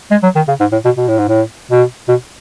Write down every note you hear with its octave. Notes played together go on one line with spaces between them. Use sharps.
G#3
F#3
D#3
C#3
G#2
A2
B2
B2
A2
G#2
A2
B2
B2